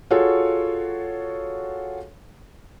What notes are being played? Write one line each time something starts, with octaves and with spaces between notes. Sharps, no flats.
F4 F#4 G#4 A4 C#5